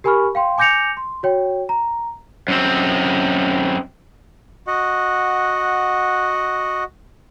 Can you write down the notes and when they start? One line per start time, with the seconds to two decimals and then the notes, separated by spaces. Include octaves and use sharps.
0.04 G4 A#4 G#5 B5 C#6 F6
0.35 F5 G5 C6
0.58 G#5 D6 G6 A#6 C#7 F7
0.97 C6
1.23 F#4 C#5 G5
1.69 A#5
2.48 F#2 C4
4.67 F#4 D#5 F#5